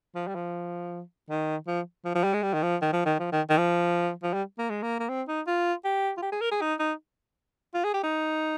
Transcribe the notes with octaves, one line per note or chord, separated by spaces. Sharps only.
F3
G3
F3
D#3
F3
F3
F3
G3
G#3
G3
D#3
F3
D#3
F3
D#3
F3
D#3
D#3
F3
F3
G3
A#3
G#3
A#3
A#3
C4
D#4
F4
G4
F4
G4
G#4
A#4
G#4
D#4
D#4
F4
G#4
G4
D#4